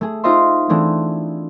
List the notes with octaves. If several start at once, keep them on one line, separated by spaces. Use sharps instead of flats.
A3 G#4
D#4 F4 C5 D#5 E5 C6
E3 A3 C4 D4 G#4